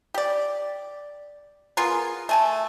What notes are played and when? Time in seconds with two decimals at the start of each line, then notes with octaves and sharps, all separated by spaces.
0.14 G4 D5
1.77 B3 F4 G#4 A#4
2.29 A3 G#5 A5